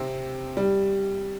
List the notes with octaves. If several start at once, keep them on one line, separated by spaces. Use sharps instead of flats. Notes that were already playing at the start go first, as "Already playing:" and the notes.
Already playing: C3 C4
G3